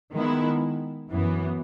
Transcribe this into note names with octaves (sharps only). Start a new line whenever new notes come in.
D#3 G#3 B3 E4
F#2 E3 B3